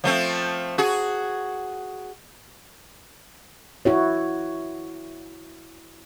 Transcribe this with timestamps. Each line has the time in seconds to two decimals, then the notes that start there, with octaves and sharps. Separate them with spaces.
0.04 F3 A3 C4
0.78 F#4 G#4
3.85 E4 F#4 C#5